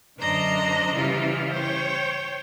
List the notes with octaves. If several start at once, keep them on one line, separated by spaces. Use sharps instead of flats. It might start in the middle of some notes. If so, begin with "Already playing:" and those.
F#2 D3 D4 C5 D#5 A#5
C#3 E3 G3 E4 F4
C5 C#5 G5